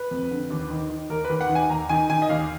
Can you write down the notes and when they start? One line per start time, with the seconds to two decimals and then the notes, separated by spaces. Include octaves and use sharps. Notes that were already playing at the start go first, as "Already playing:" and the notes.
Already playing: B4
0.11 F2
0.31 D3
0.50 D#2
0.70 D#3
0.90 D#3
1.10 D#2 A#4
1.25 B4
1.30 D#2
1.41 F#5
1.49 D#3
1.55 G#5
1.70 D#2 A#5
1.89 D#3 G#5
2.10 D#3 G#5
2.22 D#5
2.29 D#2 F5